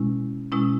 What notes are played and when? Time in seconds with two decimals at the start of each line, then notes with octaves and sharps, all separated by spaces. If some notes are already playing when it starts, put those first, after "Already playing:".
Already playing: B2 G#3 C#4 E4
0.52 B2 G#3 C#4 E4